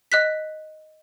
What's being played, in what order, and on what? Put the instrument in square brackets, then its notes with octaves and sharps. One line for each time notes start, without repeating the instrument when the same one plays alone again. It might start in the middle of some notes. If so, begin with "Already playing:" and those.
[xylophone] D#5 F#6 B6